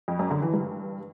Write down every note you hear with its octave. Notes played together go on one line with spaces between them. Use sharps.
F2
F#2
D3
E3
G2